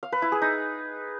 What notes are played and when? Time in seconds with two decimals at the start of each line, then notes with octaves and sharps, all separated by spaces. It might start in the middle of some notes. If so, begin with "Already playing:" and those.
0.03 F5
0.12 B4
0.22 E4
0.32 G#4
0.42 D#4